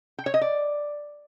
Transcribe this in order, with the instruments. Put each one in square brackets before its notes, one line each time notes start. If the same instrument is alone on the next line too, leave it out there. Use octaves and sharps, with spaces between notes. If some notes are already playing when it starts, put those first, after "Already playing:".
[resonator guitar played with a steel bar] G5
C#5
D#5
D5